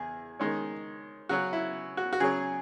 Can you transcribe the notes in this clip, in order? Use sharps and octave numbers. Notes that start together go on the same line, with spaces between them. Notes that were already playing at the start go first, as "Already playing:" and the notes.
Already playing: E2 G#4
D#3 G#3 C#4
C#3 F#3 C#4 F#4
E4
F#4
F#4
C#3 F#3 C#4 G#4